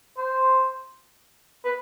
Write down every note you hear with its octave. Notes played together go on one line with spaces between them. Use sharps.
C5
B4